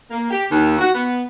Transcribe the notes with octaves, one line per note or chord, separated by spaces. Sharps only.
A#3
G4
D#2
F#4
B3